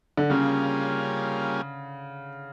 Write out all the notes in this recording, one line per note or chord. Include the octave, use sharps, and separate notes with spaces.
D3
C#3 G3 A#3 C#4 F4 G#4